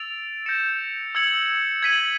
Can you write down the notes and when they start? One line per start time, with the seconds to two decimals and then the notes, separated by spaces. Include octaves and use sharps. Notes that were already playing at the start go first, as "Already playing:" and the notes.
Already playing: E6 A6 D7 F7
0.46 G6 A#6 C#7 E7
1.15 E6 G#6 C#7 F#7
1.82 G#6 B6 D#7 F#7